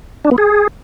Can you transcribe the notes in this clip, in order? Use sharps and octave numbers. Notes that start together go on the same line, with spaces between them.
D4
B3
G#4